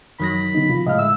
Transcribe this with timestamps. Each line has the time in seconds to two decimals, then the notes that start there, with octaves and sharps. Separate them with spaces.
0.20 F#2 D#3 F#3 B5 A#6
0.55 D3 B3 D#4
0.69 C3 F3 F4
0.87 A2 G#3 D#5 F5 F6
0.99 D3 E5 E6